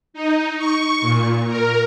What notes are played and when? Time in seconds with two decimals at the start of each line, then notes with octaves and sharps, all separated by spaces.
0.14 D#4
0.58 C#6
1.01 A#2
1.47 A#4